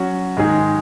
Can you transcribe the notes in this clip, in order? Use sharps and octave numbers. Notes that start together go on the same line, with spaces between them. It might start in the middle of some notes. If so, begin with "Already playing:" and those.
Already playing: F#3 C#4 F#4
G#2 D#3 G#3 D#4 G#4